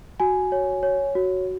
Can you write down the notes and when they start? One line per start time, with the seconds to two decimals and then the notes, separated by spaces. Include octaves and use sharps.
0.20 F#4 G#5
0.52 C#5
0.83 C#5
1.15 F#4